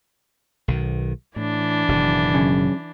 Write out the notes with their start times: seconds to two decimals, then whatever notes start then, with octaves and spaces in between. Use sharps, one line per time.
0.68 B1 D#3
1.36 A2 E3 D4
1.88 F#1 B2 D#3
2.34 F#2 C#3